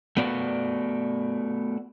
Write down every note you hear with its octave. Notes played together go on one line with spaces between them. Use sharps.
A3 B3 F#4 D5